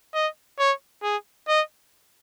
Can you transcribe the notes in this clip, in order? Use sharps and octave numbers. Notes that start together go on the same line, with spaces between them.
D#5
C#5
G#4
D#5